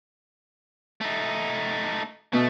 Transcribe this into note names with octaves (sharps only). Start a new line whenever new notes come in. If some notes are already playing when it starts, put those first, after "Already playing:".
A3 D#4
B2 A3